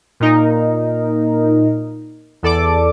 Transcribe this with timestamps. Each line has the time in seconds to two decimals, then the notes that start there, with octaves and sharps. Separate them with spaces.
0.20 A#2 D#4 A#4
2.43 E2 A4 D5 D6